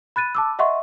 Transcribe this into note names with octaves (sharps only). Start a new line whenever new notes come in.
B5 F#6 A6 D#7
A5 D6 E6
D#5 E5 F#5 C6 C#6